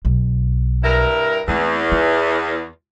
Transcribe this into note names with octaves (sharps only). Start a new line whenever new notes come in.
B1
G2 E4 A#4
E2 A3 C4
F4